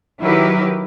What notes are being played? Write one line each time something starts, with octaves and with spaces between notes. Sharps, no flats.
D#3 F#3 E4 G4 A#4 B4